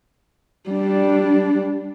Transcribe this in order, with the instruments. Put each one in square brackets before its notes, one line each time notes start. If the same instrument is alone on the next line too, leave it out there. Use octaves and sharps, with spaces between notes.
[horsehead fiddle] G3 D4